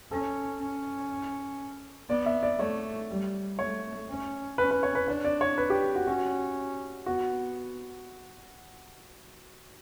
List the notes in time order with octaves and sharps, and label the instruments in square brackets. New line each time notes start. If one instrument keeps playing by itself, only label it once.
[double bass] C#4 [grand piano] A4
[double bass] C#4
[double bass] B3 [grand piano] D5
[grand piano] E5
D5
[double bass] A3 [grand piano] C#5
[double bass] G3
[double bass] A3 [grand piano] C#5
[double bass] C#4
[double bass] C#4 [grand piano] B4
[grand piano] B4
C#5
B4
[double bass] D4 [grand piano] C#5
[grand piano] D5
C#5
B4
G4
F#4
[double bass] C#4 [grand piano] F#4
[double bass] B3 [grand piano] F#4